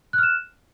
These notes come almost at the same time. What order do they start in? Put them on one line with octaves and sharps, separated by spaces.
F#6 F6 E7